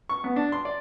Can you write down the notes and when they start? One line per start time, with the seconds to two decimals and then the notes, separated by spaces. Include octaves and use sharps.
0.09 C#6
0.24 B3
0.36 D4
0.52 C6
0.65 D5